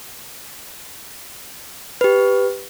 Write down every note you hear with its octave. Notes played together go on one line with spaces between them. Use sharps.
G4 B4